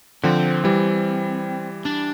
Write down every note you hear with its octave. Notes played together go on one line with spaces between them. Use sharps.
D3 F3 C4
E3 G3
D4